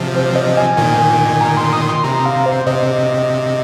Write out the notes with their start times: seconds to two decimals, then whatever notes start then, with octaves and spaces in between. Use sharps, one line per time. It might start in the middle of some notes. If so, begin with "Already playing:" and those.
Already playing: C3 F3
0.15 C5
0.35 D#5
0.57 G#5
0.77 A#2 D#3
1.41 A#5
1.57 C6
1.73 D#6
1.89 C6
2.04 C3 A#5
2.26 F5
2.46 C5
2.67 C3 D#5